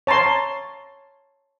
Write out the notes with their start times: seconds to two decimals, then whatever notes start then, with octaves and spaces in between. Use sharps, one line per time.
0.07 C#5 A5 A#5 C6